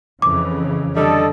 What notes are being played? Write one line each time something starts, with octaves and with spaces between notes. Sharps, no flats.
F2 C#3 E3 D6
D3 G3 A4 D#5